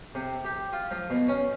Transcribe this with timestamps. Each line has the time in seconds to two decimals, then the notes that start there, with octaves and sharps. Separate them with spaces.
0.15 C3
0.45 G4
0.73 F4
0.91 F3
1.10 B2
1.28 C#4